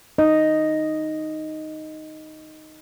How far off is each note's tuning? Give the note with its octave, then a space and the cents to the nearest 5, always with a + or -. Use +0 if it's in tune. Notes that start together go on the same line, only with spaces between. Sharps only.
D#4 +0 D#5 +0